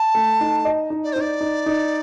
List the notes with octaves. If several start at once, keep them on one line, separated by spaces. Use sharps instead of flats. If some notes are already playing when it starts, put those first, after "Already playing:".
Already playing: A5
A3
D#4
D#5
D#4
D5
C5
D#4 D5
D#4
D#4